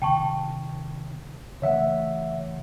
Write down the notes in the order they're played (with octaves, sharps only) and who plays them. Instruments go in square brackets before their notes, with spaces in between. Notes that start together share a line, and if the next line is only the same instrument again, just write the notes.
[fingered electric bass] C3 D#3 [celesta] G5 A5 C#6
[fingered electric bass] C#3 E3 A3 [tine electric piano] C#5 E5 F#5